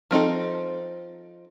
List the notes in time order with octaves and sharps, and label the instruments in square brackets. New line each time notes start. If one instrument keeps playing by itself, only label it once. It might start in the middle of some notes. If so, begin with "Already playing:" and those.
[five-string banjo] F3 C4 D#4 A4